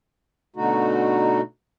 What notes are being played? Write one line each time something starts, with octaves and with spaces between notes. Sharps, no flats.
B2 D3 A3 D#4 F#4